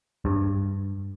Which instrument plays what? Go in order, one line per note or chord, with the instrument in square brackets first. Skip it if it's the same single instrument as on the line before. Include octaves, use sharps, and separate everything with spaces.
[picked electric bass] G2